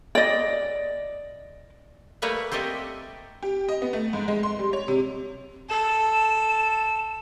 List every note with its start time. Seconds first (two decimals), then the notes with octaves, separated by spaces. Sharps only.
0.15 D5 D#5
2.22 G3 A3 A#3 B4 C#5 D5
2.52 C4 G4 A4 D#5 E5
3.43 G4
3.69 D#5
3.82 B3
3.93 A3
4.13 G#2
4.28 G#3
4.43 C6
4.59 G3
4.73 C#5
4.88 C3
5.69 A4 E7